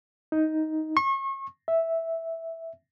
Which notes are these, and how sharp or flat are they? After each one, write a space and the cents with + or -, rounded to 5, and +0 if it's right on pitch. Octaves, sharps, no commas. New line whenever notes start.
D#4 +10
C#6 -35
E5 -5